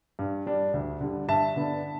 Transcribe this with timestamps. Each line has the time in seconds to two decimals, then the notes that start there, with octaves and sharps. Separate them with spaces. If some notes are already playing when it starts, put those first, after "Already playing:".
0.19 G2
0.46 G3 D4
0.73 D2
1.01 D3 G3
1.28 G2 E5 A5
1.56 D3 B3 D4